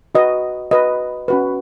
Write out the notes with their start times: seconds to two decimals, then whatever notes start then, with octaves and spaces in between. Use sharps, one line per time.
0.15 F#4 B4 D#5
0.71 F#4 B4 D#5
1.28 C#4 F#4 B4